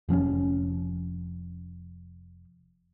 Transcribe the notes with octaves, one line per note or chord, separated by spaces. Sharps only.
F1 F3 C4 C#4